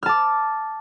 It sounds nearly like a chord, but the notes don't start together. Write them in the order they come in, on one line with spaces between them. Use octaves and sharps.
F6 A5 D6